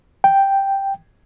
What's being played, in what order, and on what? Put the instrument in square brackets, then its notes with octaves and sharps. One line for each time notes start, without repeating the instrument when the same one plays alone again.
[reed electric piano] G5